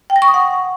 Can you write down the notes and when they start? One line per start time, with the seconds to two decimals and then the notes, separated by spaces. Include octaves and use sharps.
0.10 G5
0.16 A#6
0.22 C#6
0.28 D#6
0.34 F#5